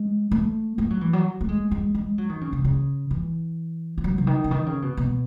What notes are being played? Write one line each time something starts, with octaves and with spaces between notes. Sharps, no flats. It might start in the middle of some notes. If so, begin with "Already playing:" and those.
Already playing: G#3
A3
A3
F#3
E3
F#3
A3
G#3
G#3
G#3
F#3
D#3
C#3
C#3
C#3
E3
E3
F#3
C#3
D#3
C#3
D#3
C#3
B2
B2